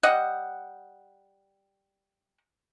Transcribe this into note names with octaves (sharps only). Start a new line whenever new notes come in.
G3 D#5 F#5